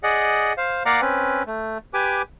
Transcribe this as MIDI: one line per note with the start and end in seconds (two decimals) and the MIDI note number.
0.03 0.53 68
0.03 0.53 74
0.03 0.53 75
0.03 0.53 78
0.57 0.83 72
0.57 0.83 77
0.86 1.01 58
0.86 1.01 74
0.86 1.01 77
0.86 1.01 78
0.86 1.01 82
0.86 1.01 86
1.01 1.43 60
1.01 1.43 61
1.01 1.43 71
1.47 1.78 57
1.94 2.22 67
1.94 2.22 71
1.94 2.22 80
1.94 2.22 86